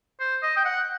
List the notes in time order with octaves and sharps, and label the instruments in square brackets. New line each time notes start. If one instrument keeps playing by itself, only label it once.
[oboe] C5
D#5
G5
F#5